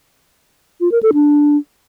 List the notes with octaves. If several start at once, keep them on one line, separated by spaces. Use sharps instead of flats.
F4
A#4
A4
D4